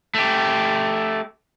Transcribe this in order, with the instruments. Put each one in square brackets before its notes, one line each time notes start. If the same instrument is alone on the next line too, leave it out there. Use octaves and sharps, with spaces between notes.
[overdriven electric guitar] A3 G4